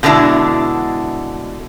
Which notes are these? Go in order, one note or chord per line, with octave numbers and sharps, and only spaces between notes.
B2 D3 G#3 D4 E4